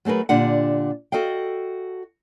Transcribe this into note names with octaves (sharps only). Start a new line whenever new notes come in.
F#3 A3 G#4 A#4 B4
A#2 D3 D4 G4 F#5
F#4 A4 D#5 F5 G5